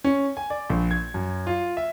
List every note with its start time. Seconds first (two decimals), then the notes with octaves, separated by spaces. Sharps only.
0.04 C#4
0.37 G#5
0.50 D5
0.70 A#1
0.91 G#6
1.14 F#2
1.47 F4
1.77 E5